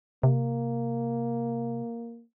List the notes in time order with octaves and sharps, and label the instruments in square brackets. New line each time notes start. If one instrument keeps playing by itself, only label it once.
[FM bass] C3 [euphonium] A#3